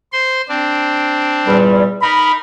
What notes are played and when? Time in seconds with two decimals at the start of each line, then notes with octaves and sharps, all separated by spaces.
0.13 C5 C6
0.49 C4 D4
1.47 E2 A#2 G3
2.02 D#4 A#4 B5